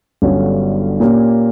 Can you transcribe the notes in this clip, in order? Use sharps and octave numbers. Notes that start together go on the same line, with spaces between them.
G1 G2 D3 F#3 C#4
A#2 A#3 C#4 G4